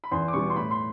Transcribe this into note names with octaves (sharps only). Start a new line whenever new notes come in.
B5
E2 C6
D6
B2 G3 B3 C#6
C6
A2 B5
C6